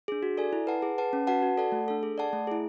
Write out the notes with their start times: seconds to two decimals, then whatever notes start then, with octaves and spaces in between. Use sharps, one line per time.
0.08 D4 G#4
0.23 F#4
0.37 A4 D5 G#5
0.53 E4
0.67 B4 F#5 A5
0.82 G#4
0.98 B4 F#5 A5
1.13 C#4
1.27 F#4 B4 F#5 A5
1.42 F#4
1.58 A4 D5 F#5 A5
1.72 A3
1.88 D4 A4
2.03 G#4
2.18 D5 F#5 A5
2.33 A3
2.47 E4 G#4